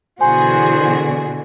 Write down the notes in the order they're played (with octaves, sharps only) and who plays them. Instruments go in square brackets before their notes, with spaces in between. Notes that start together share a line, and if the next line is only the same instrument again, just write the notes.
[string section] B2 D3 E3 [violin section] F#4 G#4 [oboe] C5 [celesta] G#5